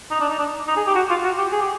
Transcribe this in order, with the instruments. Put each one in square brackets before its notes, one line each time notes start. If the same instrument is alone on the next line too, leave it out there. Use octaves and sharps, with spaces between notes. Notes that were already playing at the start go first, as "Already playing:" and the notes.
[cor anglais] D#4
D4
D#4
D4
D#4
G#4
G4
F#4
F4
F#4
G4
G#4
G4